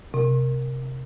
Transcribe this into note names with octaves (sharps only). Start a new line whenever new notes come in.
C3